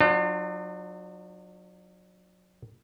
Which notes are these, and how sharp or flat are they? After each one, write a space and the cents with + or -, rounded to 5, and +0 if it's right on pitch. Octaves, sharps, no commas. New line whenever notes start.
F#3 -20 D4 +45 F4 +0